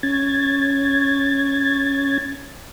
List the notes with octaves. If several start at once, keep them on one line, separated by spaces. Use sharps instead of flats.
C#4 G#6 A6